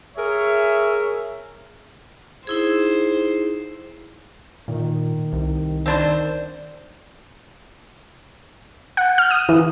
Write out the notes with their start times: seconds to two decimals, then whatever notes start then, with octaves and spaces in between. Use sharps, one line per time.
0.17 G#4 A#4 C#5 E5
2.47 D#4 E4 G#4 C5
4.68 A#2 D#3
5.33 C2
5.86 D#3 C4 D4 C5
8.97 F#5
9.18 F6
9.31 D#6
9.49 E3